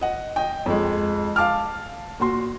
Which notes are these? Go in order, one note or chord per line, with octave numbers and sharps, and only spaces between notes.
D#5 F#5
D#5 G5
F2 G#3
F5 A5 D6 F6
A#2 F#4 C6